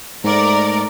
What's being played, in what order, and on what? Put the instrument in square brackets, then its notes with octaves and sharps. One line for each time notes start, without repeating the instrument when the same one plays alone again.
[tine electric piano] G#2 [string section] A3 A#4 D5